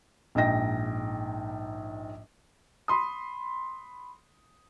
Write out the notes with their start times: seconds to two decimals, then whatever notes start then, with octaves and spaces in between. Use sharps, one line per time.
0.35 A#1 G#2 D#4 G5 A#6
2.88 B5 C6 D#6